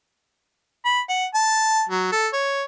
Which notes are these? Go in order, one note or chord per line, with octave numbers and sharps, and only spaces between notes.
B5
F#5
A5
F#3
A4
C#5